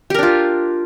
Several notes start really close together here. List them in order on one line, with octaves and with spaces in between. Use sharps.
G4 A#4 D4 F4